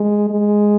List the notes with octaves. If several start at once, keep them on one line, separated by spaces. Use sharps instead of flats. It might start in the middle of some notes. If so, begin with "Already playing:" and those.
Already playing: G#3
G#3